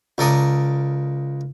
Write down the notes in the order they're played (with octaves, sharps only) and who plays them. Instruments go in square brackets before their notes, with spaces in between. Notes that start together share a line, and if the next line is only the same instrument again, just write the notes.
[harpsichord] C#2 A4 A#4 D5 D#6